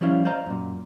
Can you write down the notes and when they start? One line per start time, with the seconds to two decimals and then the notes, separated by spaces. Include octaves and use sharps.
0.01 F3 G3 C#4 E4 F5
0.25 C5 D5 D#5 F5 A#5
0.46 F#2 A#2